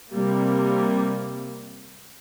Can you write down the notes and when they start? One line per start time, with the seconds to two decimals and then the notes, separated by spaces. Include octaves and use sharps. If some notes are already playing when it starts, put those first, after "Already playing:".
0.12 C3 G3 A#3